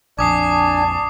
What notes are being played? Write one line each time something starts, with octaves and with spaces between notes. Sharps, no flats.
A#1 F2 D4 G#5 A5 D6 D#6 C7